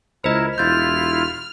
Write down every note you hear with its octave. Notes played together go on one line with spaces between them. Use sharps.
C#2 E4 A#4 C5 D#5 E5
E1 E4 F4 F6 G6 A6